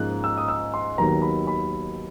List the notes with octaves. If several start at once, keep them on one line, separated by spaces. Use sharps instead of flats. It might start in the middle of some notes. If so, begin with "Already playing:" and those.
Already playing: G#2 F3 A#3 C#4 F#6
E6
D#6
E6
C6
D#2 D#3 F#3 B3 A#5
B5
B5